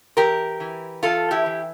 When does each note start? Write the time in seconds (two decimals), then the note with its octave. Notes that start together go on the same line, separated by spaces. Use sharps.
0.17 E2 G4 A#4
0.60 E3
1.03 E2 F4 A4
1.31 E4 G4
1.46 E3